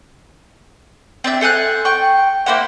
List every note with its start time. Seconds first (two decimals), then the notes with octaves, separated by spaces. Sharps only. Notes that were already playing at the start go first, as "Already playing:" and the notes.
1.24 C4 D4 E5
1.41 A4 C5 G#5 F#6
1.85 G5 C#6
2.46 A#3 E4 C5 F#5